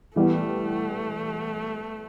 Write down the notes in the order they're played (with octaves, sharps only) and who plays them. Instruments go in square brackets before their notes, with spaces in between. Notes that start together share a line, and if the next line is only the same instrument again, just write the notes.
[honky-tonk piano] E3 G3 B3 [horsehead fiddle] A3